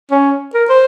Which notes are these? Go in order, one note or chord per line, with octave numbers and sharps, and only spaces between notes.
C#4
A#4
C5